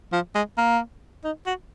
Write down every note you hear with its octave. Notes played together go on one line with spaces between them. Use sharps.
F3
G#3
A#3
D#4
F#4